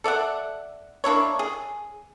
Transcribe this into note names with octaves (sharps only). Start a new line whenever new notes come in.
A4 D5 E5 F#5
A#3 D4 E4 C#5
G#4